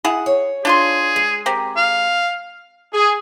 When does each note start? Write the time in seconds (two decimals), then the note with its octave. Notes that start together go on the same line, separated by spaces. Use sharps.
0.05 E4 G#4 F#5
0.26 C#5
0.65 D4 F4 G#4 C6
1.16 G#3
1.46 C4 G4 A#4
1.77 F5
2.93 G#4